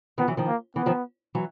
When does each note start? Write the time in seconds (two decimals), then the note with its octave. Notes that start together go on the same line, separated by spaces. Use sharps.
0.18 D#3 F3 B3
0.27 E3 F#3
0.37 D#3 F3
0.47 A#3
0.76 E3 B3
0.86 D#3 F3
1.35 E3 F#3